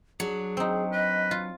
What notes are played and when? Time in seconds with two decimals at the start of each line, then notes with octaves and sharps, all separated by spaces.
0.20 F#3 D4 G#4
0.57 C4 D#4
0.92 B4 D#5
1.31 F4